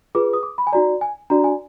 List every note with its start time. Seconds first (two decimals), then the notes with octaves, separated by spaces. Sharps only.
0.15 F4 G#4 B4 D6
0.33 D#6
0.43 D6
0.58 B5
0.67 G#5
0.73 D#4 F#4 D5 A#5
1.01 G#5
1.30 D4 F#4 D5 A#5
1.44 G#5